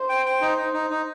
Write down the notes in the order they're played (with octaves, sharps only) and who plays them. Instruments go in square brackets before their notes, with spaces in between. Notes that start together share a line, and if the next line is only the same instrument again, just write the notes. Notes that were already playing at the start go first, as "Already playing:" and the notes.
Already playing: [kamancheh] C5
[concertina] G5
G5
D#4
D#4
D#4
D#4